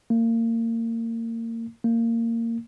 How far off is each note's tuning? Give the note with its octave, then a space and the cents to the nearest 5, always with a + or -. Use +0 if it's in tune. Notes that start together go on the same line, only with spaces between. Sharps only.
A#3 -30
A#3 -20